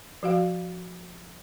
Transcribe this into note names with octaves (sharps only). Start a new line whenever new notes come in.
F3 F#4 F5